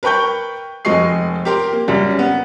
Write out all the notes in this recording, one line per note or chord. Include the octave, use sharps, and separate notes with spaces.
A#4 B4 G5 C#6 G6
F1 G#3 D#5 C#6 C7
G4 A#4 C6
A#3
F#2 C#3 G3
B3